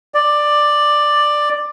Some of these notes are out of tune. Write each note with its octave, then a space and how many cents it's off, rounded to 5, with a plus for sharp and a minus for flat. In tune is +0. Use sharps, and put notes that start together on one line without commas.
D5 +10